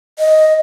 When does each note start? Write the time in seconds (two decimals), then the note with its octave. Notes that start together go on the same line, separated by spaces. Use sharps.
0.19 D#5